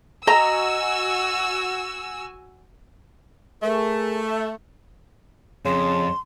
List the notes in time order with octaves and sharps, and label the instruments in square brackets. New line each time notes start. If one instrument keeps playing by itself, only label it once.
[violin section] F#4 G#5 E6 [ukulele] D#5 A#5
[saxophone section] A3 [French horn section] G#4 A#4
[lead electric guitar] F2 [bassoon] C#3 [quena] C6